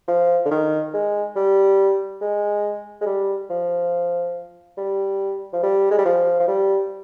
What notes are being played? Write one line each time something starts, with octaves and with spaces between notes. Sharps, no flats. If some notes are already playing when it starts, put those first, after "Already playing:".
F3
D3
D#3
G#3
G3
G#3
G#3
G3
F3
G3
F3
G3
G#3
G3
F3
F3
G3